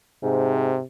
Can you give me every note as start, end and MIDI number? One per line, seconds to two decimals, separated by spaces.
0.23 0.75 44
0.23 0.83 48